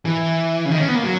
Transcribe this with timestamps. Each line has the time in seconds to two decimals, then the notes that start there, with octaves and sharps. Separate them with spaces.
0.05 E3
0.65 C#3
0.71 D#3
0.79 C#4
0.88 B3
0.96 A#3
1.04 F#3